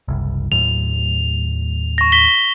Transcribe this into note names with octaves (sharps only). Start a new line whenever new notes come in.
F#1 C2
D#2 A2 F#3 F7
C#6 A#6
B6 G7